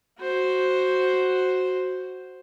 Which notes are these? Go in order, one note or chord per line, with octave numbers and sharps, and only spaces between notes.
F#4 C5